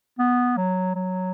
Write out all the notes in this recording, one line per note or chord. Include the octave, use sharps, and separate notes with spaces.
B3
F#3
F#3